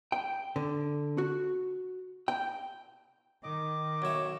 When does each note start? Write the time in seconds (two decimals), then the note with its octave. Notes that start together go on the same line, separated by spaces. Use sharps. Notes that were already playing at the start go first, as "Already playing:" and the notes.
0.12 G5
0.56 D3
1.18 F#4
2.28 G5
3.43 D#3 D#5 D6
4.02 B1 E4 C#5